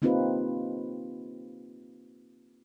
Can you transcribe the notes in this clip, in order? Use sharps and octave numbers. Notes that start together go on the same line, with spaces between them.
A#3 C4 D#4 F4 G4 B4